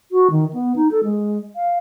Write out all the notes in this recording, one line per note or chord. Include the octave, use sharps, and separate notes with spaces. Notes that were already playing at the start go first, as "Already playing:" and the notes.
F#4
D#3
B3
D#4
A4
G#3
F5